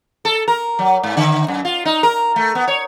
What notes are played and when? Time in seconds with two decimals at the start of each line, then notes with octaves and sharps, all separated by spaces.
0.25 A4
0.48 A#4
0.79 F#3
1.03 G#2
1.17 D3
1.48 F#2
1.65 F4
1.85 D#4
2.03 A#4
2.36 A3
2.55 B3
2.68 C#5